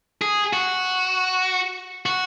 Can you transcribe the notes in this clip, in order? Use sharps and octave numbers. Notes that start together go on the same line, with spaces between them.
G#4
F#4
F#4